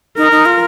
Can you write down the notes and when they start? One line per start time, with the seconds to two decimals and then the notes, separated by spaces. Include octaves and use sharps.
0.17 D#4 A#4
0.31 D#4
0.46 F4